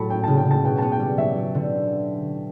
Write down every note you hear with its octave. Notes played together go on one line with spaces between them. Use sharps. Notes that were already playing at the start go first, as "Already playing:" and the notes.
Already playing: A2 F#3 A5 B5
C#4 G5
C#3 A5
G5
C#3
A5
B2 G5
B3 A5
G5
G3
F#3 E5
F#3
D3